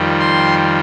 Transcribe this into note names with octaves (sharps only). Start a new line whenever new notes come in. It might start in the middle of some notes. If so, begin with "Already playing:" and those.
Already playing: F2 D#3 G3
C6